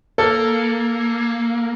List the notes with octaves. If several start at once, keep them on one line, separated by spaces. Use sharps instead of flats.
A#3 A4